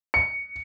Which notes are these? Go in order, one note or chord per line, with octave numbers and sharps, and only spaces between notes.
C#7